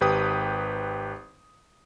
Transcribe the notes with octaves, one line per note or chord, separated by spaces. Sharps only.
G#1 G4 B4 G5 D#6